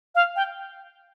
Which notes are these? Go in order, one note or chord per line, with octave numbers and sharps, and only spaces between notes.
F5
G5